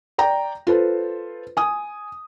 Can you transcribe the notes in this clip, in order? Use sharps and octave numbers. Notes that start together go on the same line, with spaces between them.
D5 G5 A#5
F4 A4 B4 C5
G#5 D#6